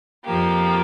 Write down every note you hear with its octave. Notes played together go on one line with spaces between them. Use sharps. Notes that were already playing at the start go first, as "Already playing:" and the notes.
F2 F3 A#3 G4